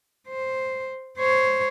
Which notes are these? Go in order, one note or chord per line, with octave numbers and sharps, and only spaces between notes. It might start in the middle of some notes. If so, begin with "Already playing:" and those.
C5
C5 C#5